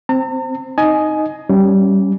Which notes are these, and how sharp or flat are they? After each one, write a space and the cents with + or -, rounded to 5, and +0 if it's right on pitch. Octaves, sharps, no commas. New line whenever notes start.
C4 +0 A#5 -45
D#4 +0 D#5 +0 G#5 +20
G3 -15 C#4 +0